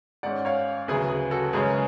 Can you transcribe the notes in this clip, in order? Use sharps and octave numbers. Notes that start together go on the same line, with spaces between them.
G#2 G#3 C#4 D5 F#5
C#5 F5
D2 C#3 F#3 G#4 B4
G#4
F#4 A4
F#2 C#3 G#3 C#4 G#4 B4